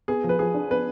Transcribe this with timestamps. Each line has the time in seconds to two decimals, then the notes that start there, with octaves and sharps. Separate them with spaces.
0.08 B3 G#4
0.24 F3
0.29 B4
0.39 F3 G#4
0.54 D4
0.70 B3 B4